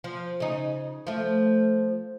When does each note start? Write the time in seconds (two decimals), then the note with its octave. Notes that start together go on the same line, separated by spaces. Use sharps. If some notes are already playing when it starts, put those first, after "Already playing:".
0.04 F3
0.40 C#3 D#4
1.07 F3 A3